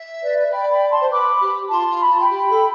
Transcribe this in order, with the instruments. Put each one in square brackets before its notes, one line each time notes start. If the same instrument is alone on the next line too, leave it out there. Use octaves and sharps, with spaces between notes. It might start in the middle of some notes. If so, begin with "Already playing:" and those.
Already playing: [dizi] E5
[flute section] B4 D5
[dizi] E5
[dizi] D5 [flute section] G5 B5
[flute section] G5 B5
A5 C6
[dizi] C5
[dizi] B4 [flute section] B5 D6
[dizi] G4
[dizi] F4 [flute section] A5 C6
[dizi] F4
[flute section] B5
[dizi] F4 [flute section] A5
[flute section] G5 B5
[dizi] G4
A4